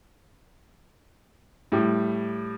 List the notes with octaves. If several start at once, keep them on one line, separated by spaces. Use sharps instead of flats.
A2 G3